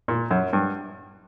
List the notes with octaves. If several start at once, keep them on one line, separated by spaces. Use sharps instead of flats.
A#2
F#2
G2